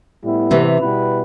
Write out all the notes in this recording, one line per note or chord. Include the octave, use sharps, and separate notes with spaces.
A2 G3 B3 E4
C3 E3
B2 G3 B3 E4 B4